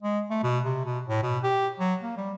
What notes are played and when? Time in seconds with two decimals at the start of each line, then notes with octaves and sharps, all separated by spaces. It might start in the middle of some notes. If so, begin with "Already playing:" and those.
0.03 G#3
0.30 A3
0.43 B2
0.65 C3
0.85 B2
1.08 A2
1.23 B2
1.43 G4
1.80 F#3
2.02 A#3
2.17 G3